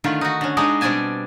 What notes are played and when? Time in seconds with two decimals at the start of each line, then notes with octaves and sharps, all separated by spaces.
0.04 D3 D#3 A3 F4
0.21 D#4 F#4
0.41 D3 C#4
0.57 G#3 D4 D#4 G#4 D#5
0.81 B2 G3 C4 D4 G#5 A5